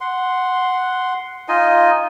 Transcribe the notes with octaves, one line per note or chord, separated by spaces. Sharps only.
F#5 C6
D#4 F4 D#5 G#5